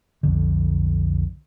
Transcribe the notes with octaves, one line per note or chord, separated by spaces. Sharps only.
B1 F2 D3